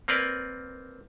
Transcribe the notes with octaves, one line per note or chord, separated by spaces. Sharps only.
A#3 C4 A#4 B4 D5